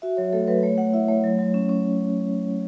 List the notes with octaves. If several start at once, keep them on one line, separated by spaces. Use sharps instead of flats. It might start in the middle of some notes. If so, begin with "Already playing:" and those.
F#4 E5
F#3 C#5
A3 A4
F#3 B4
A3 C#5
A3 F#5
E4 E5
A3 C#5
F#3
F#3
C#4
C#4